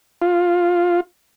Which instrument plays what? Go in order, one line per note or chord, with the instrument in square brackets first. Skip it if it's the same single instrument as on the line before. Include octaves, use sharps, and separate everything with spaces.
[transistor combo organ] F4